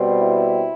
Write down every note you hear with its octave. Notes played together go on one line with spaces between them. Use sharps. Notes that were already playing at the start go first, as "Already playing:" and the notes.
Already playing: B2 G3 C4
E4